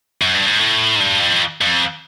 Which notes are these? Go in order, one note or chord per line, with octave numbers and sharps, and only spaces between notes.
F#2
G2
G#2
A2
G#2
G2
F2
F2